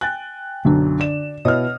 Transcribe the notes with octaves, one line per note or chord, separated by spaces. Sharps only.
G5 G#5 F#6 A6
B1 F#2 D3 D4
D5 E7
B2 E4 C#5 D#5 D#6 F6